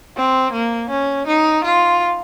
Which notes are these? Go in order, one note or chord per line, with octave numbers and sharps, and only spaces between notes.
C4
A#3
C#4
D#4
F4